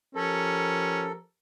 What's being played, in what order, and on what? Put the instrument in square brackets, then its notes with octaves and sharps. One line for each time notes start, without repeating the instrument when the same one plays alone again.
[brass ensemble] F3 G4 A#4 [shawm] C#4 [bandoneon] A4